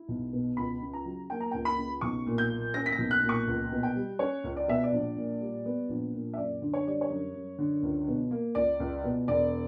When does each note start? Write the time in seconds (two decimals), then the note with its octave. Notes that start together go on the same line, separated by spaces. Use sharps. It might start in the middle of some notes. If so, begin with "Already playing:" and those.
Already playing: E4
0.08 B1
0.33 B2
0.57 C#2 B5
0.81 C#3
0.93 A#5
1.05 F#3
1.30 A#3 G5
1.40 A#5
1.51 C#2 G5
1.65 B5
1.78 C#3
2.01 B1 C#6
2.26 A#2
2.38 G6
2.50 A#3
2.74 C#4 A#6
2.86 B6
2.92 A#6
2.98 B1
3.11 F#6
3.23 A#2
3.29 C#6
3.47 C#2
3.72 B2
3.83 G5
3.96 G3
4.19 C#4 C#5
4.44 C#2
4.57 D5
4.68 B2 E5
4.83 D5
4.92 A#1
5.16 A#2
5.41 G3
5.66 B3
5.89 A#1
6.13 A#2
6.34 E5
6.37 F#2 D5
6.62 D3
6.74 C#5
6.86 G3 D5
7.01 C#5
7.10 F#2
7.34 F#2
7.58 D3
7.83 C#2
8.07 B2
8.31 A#3
8.55 C#2 D5
8.80 C#2
9.04 B2
9.28 E1 D5